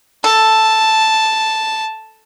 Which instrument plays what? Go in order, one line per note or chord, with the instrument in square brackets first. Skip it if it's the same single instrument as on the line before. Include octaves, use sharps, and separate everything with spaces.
[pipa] A4 [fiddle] A5